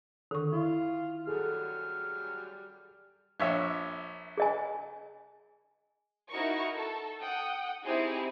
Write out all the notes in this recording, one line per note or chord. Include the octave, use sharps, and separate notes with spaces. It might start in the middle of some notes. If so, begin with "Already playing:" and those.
D3 D#3 C#6
E4 F4
F#3 G3 G#4 A4 F6
A#1 C#5 E5
G#4 D#5 G#5
D#4 E4 F#4 A#4 C#6
A4
F#5 G5 D#6
C4 D#4 E4 G4 G#4 C5